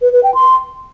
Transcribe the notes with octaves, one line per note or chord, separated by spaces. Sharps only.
B4
B4
G5
C6